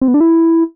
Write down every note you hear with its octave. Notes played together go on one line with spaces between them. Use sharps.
C4
B3
D4
E4